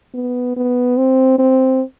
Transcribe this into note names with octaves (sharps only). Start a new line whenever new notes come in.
B3
B3
C4
C4